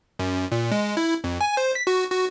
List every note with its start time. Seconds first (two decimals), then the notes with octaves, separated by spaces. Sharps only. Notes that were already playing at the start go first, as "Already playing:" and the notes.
0.19 F#2
0.52 A#2
0.72 G#3
0.97 E4
1.24 F2
1.41 G#5
1.57 C5
1.75 B6
1.87 F#4
2.11 F#4